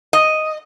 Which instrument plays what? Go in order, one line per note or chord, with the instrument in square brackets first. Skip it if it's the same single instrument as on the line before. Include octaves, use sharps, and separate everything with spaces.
[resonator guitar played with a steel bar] D#5